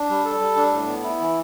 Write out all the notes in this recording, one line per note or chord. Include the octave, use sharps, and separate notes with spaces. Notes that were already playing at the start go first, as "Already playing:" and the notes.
Already playing: D4
G3
A4
G3
D4
A2
B3
E4
E3